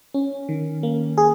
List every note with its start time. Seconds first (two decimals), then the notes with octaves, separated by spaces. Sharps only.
0.14 C#4
0.49 D#3
0.83 A#3
1.18 G#4